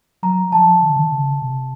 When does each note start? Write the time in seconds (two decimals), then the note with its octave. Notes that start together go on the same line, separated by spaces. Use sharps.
0.23 F#3 A#5
0.52 F3 A5
0.82 D#3
0.89 D3
0.97 D#3
1.12 C#3
1.42 C3